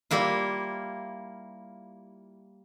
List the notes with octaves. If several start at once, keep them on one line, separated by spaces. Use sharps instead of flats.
G3 A#3 E4 F4